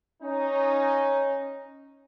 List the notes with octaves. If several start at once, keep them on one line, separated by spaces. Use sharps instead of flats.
C#4 D#4